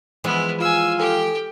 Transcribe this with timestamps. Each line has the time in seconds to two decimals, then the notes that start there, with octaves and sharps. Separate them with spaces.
0.24 E3 F3 G#3 B3 E4
0.60 F4 G#5 E6
0.99 G4 A4 G5 G#5